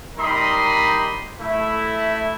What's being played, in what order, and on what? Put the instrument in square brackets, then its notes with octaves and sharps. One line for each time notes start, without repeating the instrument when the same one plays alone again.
[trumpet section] G3 D#4 A#4 B5 C6 D#6
A3 E4